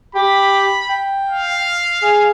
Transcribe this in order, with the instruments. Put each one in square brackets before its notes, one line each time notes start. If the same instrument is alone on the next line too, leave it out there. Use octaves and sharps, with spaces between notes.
[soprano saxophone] G4 [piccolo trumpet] B5
[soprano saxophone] G5
[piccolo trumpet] F5
[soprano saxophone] G#4